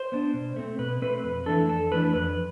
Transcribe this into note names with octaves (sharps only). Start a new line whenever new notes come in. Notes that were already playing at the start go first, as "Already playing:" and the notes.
Already playing: C5
B3 D4
B2
A3 C4
B2 B4
A3 C4 B4
F2 B4
E3 A3 D4 A4
F2 A4
E3 A3 D4 B4
F2 B4